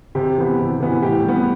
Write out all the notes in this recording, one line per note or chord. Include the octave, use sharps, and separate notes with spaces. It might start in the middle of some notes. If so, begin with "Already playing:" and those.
C3 G4
E3 B3
C3
E3 B3
A2 G4
G3 B3